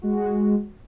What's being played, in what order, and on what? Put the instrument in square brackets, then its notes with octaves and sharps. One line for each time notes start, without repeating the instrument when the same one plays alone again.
[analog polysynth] G#3 F#4